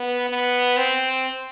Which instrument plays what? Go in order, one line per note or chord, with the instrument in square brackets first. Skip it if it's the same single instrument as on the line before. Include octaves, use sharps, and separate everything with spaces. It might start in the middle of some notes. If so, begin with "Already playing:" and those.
Already playing: [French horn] B3
B3
C4